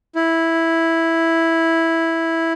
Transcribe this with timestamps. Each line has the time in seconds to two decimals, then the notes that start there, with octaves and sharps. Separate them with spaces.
0.15 E4